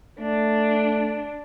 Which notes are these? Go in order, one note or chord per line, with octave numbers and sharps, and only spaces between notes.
A3 D4